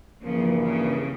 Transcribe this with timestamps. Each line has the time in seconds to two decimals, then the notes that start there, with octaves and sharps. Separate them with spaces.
0.23 G2 C#3 E3 F3 A#3
0.64 C#3